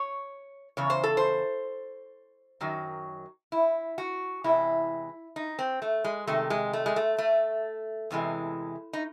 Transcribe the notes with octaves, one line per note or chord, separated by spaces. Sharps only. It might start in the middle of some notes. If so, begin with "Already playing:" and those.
Already playing: C#5
E2 C#3 C#5
C5
A4
C5
F#2 D#3 F#3
E4
F#4
E2 C3 E3 G#3 E4
D#4
C4
A3
G#3
C3 D#3 G#3 A3
G#3
A3
G#3
A3
A3
E2 C3 E3 G#3
D#4